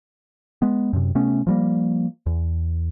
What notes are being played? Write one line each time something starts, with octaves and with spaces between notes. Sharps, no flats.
G#3 B3
F#2 C3
C3 A3 B3 C#4
F3 G3 A#3
E2